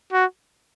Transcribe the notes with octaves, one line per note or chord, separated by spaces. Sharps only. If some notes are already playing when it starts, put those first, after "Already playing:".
F#4